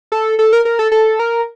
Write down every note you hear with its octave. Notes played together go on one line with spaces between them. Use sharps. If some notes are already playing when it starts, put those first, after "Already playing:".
A4
A4
A#4
A#4
A4
A4
A#4